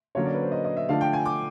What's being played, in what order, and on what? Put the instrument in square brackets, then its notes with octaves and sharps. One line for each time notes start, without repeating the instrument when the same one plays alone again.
[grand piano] D3 F#3 A#3 C#4 C#5
D5
B4
C5
D#5
D#5
E5
D3 F3 A3 D4 F5
G5
G#5
D6